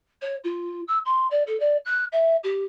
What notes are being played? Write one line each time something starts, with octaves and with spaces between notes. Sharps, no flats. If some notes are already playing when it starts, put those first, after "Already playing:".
C#5
F4
E6
C6
D5
A4
D5
F#6
E5
G4